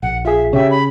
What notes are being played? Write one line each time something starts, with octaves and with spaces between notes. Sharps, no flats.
A#1 F#5
F4 G#4 E5
C#3 G4 C#5 E5
B5